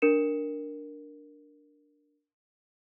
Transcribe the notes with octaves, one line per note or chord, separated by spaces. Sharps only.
D4 A#4 C#7 E7